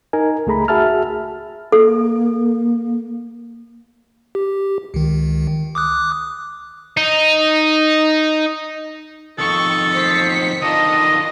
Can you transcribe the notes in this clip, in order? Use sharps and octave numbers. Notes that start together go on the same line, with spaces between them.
D#4 A#4 G#5
C#2 A3 G#4 A#5 B5
F#4 G#4 E5 A5 F6
A#3 A4
G4
C#2 D#3
D6 D#6 F#6
D#4
F2 D#3 A4 C#6
C5 B6 C#7
D3 D#3 D4 F4 D#5 D#6 A#6